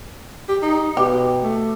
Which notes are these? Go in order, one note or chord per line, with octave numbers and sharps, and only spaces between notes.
G4
D#4
B2 G4
A3